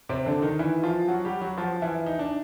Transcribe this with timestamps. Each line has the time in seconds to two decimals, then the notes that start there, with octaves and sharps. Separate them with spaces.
0.09 C3 C4
0.26 D3 D4
0.42 D#3 D#4
0.59 E3 E4
0.84 F3 F4
1.08 F#3 F#4
1.25 G3 G4
1.41 F#3 F#4
1.58 F3 F4
1.82 E3 E4
2.06 D#4
2.19 D4